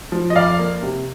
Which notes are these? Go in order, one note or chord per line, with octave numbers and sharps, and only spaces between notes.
F3
D#5
F2 D5 F5
A#3
C3